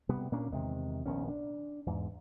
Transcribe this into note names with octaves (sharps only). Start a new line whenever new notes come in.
C3 G3 B3
A#2 A#3 C#4 D4
E2 C3 D#3 G#3
A#1 D#3 B3 C#4
D4
E2 G#2